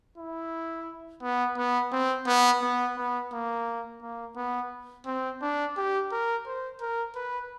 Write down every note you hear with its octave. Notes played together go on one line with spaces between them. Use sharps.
E4
B3
B3
C4
B3
B3
B3
A#3
A#3
B3
C4
D4
G4
A#4
C5
A#4
B4